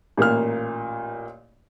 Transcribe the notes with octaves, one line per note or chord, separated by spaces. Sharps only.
A1 A#2 A#3 F6